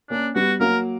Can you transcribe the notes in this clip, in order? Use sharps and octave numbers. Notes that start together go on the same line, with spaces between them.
A#3 C#4 D4
G3 B3 F#4
F#3 A#3 A#4